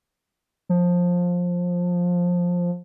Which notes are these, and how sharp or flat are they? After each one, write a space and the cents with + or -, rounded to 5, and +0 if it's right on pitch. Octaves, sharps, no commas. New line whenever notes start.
F3 +15